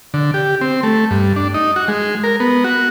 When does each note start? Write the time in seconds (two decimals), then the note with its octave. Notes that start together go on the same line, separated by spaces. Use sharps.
0.14 D3
0.34 G4
0.61 C4
0.83 A3
1.11 G2
1.36 D4
1.54 D#4
1.76 F#4
1.88 G#3
2.24 A#4
2.40 B3
2.64 F#4